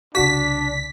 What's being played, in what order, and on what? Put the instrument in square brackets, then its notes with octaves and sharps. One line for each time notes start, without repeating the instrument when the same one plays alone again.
[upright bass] C2 C#3 [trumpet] D4 [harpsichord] F#4 [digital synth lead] B6